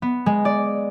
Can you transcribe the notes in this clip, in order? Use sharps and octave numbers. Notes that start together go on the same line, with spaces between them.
B3
G#3
D5